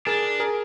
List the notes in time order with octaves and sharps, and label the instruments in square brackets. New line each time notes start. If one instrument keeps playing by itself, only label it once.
[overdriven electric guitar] D4 [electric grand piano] G#4 A#4
[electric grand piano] G#4 A#4